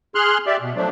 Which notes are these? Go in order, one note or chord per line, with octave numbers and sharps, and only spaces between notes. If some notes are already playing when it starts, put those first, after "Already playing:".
G#4 C6 F6 F#6
G4 D5 E5
B2
F3 F#3 A3 D4